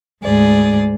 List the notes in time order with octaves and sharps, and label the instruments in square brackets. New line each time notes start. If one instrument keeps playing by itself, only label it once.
[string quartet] D2 G#2 G#4 D5